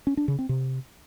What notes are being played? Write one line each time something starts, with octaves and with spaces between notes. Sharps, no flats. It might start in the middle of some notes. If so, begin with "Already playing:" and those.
C#4
D4
C#3
C4
C3